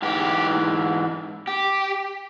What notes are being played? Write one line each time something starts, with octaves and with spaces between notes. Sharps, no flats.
G#2 E3 G4
G4